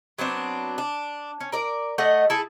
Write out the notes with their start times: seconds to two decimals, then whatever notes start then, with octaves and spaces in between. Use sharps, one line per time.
0.18 F#3 B3 C4 D4
0.78 D4
1.40 C#4
1.52 A#4 D5
1.98 A3 D#5 F#5
2.30 E4 G#4 A4